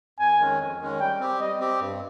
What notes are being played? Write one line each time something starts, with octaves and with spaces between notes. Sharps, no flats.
F2 G#5
D#3 G#3 C#4
F2
D#3 G#3 C#4
G3 G5
C4 G4
G3 D#5
C4 G4
G2